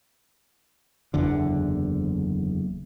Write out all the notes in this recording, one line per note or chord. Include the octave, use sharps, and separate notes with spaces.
F#1 E2 D3